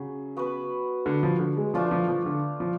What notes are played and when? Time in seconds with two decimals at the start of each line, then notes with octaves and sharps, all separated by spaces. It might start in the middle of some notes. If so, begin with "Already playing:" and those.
Already playing: C#3 F#3 F#4
0.37 B3 F#4 B4
1.06 D3
1.23 F3
1.39 D3
1.57 G#3
1.74 F3 A3 D4 F4
1.91 F3
2.08 F3
2.26 D3
2.60 F3